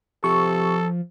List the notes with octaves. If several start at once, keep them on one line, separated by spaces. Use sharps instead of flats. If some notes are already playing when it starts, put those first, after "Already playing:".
C3 F3 A4 C#6